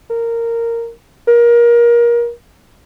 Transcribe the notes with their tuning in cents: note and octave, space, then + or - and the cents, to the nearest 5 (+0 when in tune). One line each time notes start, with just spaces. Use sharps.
A#4 -10
A#4 +25